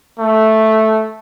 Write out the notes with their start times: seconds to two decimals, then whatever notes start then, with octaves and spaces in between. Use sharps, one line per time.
0.19 A3